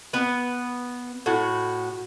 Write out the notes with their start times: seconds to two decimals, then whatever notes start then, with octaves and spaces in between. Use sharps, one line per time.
0.13 B3 B4
1.26 A2 F#4